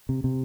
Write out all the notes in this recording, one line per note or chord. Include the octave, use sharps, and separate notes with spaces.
C3
C3